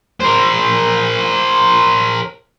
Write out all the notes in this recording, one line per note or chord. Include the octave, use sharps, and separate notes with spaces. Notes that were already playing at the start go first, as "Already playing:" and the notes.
A#4 C5